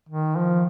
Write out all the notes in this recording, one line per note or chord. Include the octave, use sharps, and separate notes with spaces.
D#3
F3